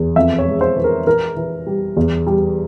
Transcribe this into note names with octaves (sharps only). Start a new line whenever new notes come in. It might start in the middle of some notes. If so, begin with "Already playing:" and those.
Already playing: E2
F2 E5
C#5
G#3
C5
E3
A#4
E3 A#4
E3
G3
E2
G3